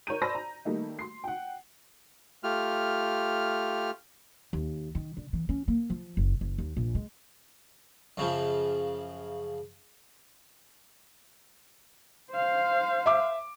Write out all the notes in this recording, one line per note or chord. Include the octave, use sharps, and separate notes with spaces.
A#4 C#5 A#5 G6 D#7
C5 D5 A5 B5 E6 A#6
A#5
D#3 G3 A3 A#3 D#4
C6 C7
F#5 G5
A3 F4 G4 F6
D#2
D#3
D3
E3
C#4
A#3
F3
F#1
F#1
D#2
A#1
G#3
F#2 C#3 F3
C5 F5
E5 D6